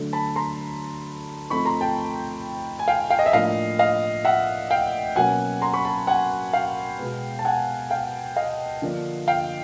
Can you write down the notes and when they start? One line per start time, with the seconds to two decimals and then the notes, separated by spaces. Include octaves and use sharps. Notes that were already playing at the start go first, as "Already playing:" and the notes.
Already playing: D3 F#3 A3
0.13 A5 B5
0.36 A#5 C6
1.50 F3 A3 C4 D#4 B5 C#6
1.65 A#5 C6
1.81 G5 A5
2.79 G#5
2.88 F5 G5
3.10 F5 G5
3.19 D#5
3.26 E5
3.33 A2 F3 A#3 D4 D#5 F5
3.79 D#5 F5
4.24 E5 F#5
4.71 F5 G5
5.16 B2 F#3 A#3 C#4 F#5 G#5
5.61 A#5 C6
5.73 B5 C#6
5.85 A5 B5
6.07 F#5 G#5
6.53 F5 G5
6.99 B2 G#3 B3
7.39 A5
7.45 F#5 G#5
7.90 F5 G5
8.36 D#5 F5
8.82 D3 F3 A#3 D4
9.28 F5 G5